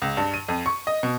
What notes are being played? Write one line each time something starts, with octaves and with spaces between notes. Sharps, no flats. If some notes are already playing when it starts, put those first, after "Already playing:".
C#2
G2
D#7
F2
C#6
D#5
B2